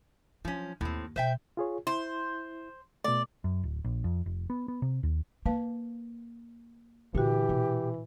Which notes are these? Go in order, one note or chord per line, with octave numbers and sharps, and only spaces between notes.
F3 F#3 C#4
D#2 A2 C4
B2 C5 E5 G5
F4 G#4 C#5
E4 C5
B2 A3 D5
F#2
D1
A#1
F2
F1
B3
B3
C3
D#2
A#3 B4 F5 A5
A#2 D3 E3 F#4 G4
B2